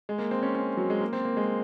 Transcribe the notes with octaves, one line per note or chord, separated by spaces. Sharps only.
G#3
A#3
C4
C#4
C#4
F#3
G#3
A#3
C4
A#3
G#3